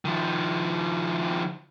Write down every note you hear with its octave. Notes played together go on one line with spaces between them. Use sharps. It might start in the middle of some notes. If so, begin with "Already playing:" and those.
D#3 F3